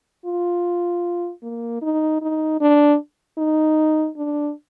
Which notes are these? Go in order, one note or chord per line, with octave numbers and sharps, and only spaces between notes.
F4
A#3
D#4
D#4
D4
D#4
D4